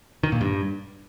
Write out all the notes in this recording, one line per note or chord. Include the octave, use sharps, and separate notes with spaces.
D#3
A#2
G2